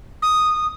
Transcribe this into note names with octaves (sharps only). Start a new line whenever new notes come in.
D#6